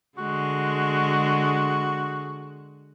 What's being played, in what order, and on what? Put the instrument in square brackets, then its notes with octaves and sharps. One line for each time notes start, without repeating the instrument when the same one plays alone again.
[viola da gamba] D3 G#3 [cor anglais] F#4